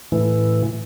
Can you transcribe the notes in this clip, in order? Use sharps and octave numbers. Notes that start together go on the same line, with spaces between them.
A2 E3